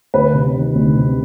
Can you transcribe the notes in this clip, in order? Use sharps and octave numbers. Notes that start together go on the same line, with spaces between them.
D2 B4
C3
D#3
D2
C3